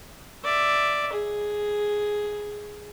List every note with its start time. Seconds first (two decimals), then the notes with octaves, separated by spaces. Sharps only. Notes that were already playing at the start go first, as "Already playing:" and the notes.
0.44 D5 E5
1.13 G#4